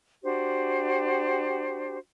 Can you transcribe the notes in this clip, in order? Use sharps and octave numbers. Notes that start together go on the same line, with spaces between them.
D4 F#4 G4 C5